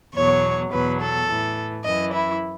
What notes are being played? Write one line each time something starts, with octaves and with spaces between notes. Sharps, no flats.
E2 B2 F#3 C#5
E2 B2 F#3 B4
A4
A2 E3
F#2 E3 D#5
E4